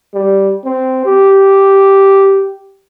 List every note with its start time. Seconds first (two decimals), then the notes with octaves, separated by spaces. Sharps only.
0.14 G3
0.65 C4
1.05 G4